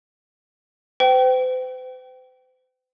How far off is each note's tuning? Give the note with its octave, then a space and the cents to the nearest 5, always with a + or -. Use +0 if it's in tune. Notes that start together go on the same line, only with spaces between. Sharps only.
C5 -45 G5 -20